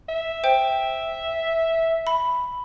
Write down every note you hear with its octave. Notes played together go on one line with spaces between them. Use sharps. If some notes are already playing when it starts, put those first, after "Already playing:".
E5
C5 G5
B5